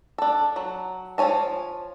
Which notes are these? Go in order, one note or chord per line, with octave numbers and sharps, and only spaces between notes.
D4 A4
F#3
F3 E4 C#5 G#5 A5